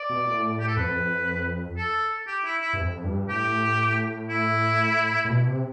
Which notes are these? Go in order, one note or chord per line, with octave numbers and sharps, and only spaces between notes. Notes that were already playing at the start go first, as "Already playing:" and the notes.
Already playing: D5
B2
A2
G4
A4
F2 B4
A4
G4
E4
E4
G2
F2
G2
A2 G4
E4
A2
B2
C3